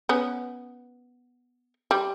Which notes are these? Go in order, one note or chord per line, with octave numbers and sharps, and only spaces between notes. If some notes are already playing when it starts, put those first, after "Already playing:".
B3 C#4
G3